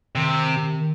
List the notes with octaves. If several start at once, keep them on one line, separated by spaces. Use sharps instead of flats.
C3 D#3
D#3